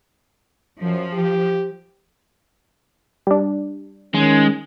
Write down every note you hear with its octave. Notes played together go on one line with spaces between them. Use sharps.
F#2 F3
G4
G3 D4
D#3 G#3 C#4